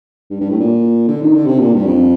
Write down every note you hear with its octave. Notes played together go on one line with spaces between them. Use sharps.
G2
G2
A2
A#2
D3
D#3
D3
C3
A#2
G2
F2